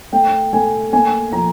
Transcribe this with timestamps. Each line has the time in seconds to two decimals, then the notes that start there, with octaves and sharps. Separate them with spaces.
0.12 A3 G5
0.53 A3 G#5
0.92 A#3 G#5
1.33 F3 A#5